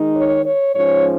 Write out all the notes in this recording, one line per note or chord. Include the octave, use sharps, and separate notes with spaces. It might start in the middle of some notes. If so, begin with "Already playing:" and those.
Already playing: D#3 G#3 D#4
C#5
C#5
G#2 F3 C#4 C#5